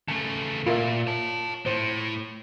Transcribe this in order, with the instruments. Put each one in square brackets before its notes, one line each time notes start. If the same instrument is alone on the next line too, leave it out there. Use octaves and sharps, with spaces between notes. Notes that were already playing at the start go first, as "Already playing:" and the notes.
[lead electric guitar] C#3 A3 [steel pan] A5
[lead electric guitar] A#2 [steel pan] F4 A#4 E5
[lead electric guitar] C#5 A5
[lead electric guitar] A2 [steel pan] C5